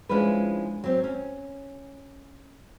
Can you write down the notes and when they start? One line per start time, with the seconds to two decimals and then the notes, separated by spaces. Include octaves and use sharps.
0.09 F3 G#3 C#4 D4 E4 B4
0.84 F#3 C4
1.04 C#4